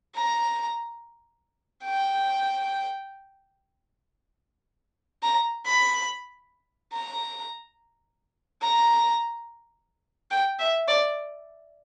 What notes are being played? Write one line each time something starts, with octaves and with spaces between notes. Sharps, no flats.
A#5
G5
A#5
B5
A#5
A#5
G5
E5
D5